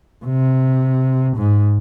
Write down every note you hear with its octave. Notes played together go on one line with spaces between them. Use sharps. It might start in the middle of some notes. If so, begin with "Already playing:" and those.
C3
G#2